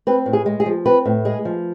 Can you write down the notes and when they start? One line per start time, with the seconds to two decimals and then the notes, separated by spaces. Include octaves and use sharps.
0.07 C4 B4
0.26 A2
0.33 G#4
0.46 G#3
0.60 G#4
0.66 F3
0.85 C4 B4
1.05 A2
1.25 G#3 G#4
1.45 F3